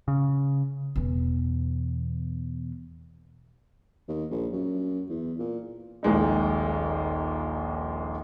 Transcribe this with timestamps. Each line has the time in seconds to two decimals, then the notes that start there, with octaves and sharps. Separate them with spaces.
0.08 C#3
0.96 E2 B2
4.08 D#2
4.30 A#1
4.53 F#2
5.09 E2
5.39 A#2
6.03 D#1 A#1 G#3 D#4